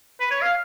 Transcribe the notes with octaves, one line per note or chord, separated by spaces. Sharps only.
B4
C#5
F5